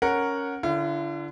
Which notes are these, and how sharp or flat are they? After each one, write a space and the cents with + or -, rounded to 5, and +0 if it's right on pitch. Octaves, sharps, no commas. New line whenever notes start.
C#4 +0 A#4 +0 F#5 -5
D3 -10 E4 +45